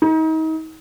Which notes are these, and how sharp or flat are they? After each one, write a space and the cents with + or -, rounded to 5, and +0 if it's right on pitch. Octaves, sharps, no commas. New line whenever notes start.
D#4 +35